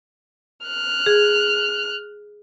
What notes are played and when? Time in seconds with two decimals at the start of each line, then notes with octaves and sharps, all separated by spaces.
0.66 F6 F#6
1.06 G#4